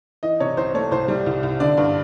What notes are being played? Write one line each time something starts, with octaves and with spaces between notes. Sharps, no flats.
E3 D#5
C3 C#5
C2 C5
A3 C#5
C2 C5
G3
C2
C2
D3 D5
G2